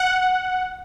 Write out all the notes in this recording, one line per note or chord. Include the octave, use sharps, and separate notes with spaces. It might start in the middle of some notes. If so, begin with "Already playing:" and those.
Already playing: F#5